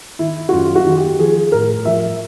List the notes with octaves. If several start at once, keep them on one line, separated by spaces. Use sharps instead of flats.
D#3 E4
F#4
F#2 F4
F#4
D#3
G4
F3 G#4
A2 A#4
F3 E5